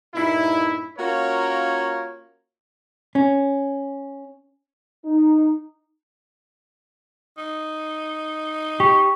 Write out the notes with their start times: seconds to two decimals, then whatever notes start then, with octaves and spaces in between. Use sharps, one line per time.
0.14 G2 A#2 D#4 E4
0.99 A#3 C#4 F4 F#4 A#4 C#5
3.15 C#4
5.05 D#4
7.38 D#4
8.80 G4 C#6